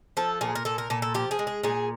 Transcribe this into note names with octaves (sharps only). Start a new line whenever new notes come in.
F3 A4
A#2 G#4
A#4
A#2 A4
A#4
A#2 A4
A4
F3 G4
G#4
G#3
G#4
A#2 G#4